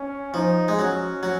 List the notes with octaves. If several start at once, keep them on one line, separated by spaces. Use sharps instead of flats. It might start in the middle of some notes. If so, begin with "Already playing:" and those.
Already playing: C#4
F3 D#4
G#3
F#3 C#4
F#3